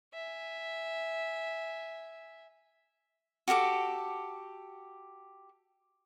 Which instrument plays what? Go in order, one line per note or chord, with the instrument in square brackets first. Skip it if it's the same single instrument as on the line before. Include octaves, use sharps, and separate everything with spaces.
[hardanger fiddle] E5 G#5
[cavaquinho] F#4 G4 A4 D6